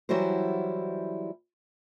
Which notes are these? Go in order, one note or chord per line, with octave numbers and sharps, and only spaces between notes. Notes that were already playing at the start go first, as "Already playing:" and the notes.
E3 F#3 G3 E4 F#4 C5